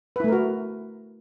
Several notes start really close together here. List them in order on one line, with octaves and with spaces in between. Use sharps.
B4 E4 A3 A#4 F#4